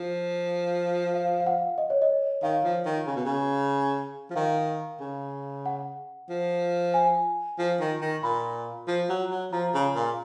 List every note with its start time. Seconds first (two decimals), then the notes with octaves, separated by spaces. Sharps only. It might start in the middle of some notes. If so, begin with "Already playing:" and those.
Already playing: F3
1.14 F5
1.40 F5
1.46 F#5
1.78 D#5
1.90 C#5
2.02 D#5
2.43 D#3 F5
2.64 F3
2.85 D#3
3.07 C#3
3.16 B2
3.25 C#3
4.30 F3
4.36 D#3 F5
5.00 C#3
5.66 F#5
6.30 F3
6.94 G#5
7.59 F3
7.80 D#3
8.01 D#3
8.23 A#2 B5
8.88 F3
9.09 F#3
9.31 F#3
9.52 F3 A#5
9.74 C#3
9.95 A#2